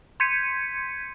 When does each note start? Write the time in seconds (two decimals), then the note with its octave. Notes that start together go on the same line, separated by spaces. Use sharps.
0.20 C6 G6 G#6 B6 C#7 D#7